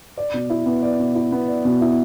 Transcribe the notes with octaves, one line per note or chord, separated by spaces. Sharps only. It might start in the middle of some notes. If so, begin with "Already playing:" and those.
D5
B2
E4
B3
D5
B2
E4
B3
D5
B2
E4